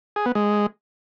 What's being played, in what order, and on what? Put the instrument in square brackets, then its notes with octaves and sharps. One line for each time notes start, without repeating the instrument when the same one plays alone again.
[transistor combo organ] G#4
B3
G#3